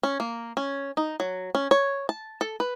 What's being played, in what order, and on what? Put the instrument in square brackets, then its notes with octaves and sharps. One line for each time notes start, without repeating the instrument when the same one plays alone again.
[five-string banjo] C#4
A#3
C#4
D#4
F#3
C#4
C#5
A5
A4
B4